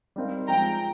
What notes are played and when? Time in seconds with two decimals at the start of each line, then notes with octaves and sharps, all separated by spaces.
0.16 G3 C4 D#4 A#4 F5
0.48 F3 G#3 C4 G5 A#5